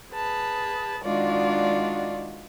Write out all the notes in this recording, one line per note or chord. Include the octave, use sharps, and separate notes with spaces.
G#4 B4 A5
D#3 G#3 D4 F4 F#4 D5